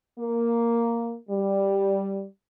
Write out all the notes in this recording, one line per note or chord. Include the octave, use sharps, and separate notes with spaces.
A#3
G3